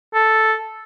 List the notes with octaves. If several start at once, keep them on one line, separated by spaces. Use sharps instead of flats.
A4